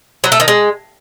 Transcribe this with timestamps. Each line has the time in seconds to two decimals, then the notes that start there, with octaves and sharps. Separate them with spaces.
0.24 F#3
0.32 A3
0.40 D#3
0.48 G#3